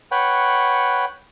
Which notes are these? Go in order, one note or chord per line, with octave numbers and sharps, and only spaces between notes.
B4 C#5 F#5 G5